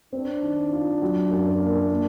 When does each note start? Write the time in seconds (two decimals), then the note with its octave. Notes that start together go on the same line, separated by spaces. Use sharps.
0.13 C4 D4
0.42 D#3
0.73 F4
1.02 F#3
1.31 F#2
1.61 A#3
1.90 A#3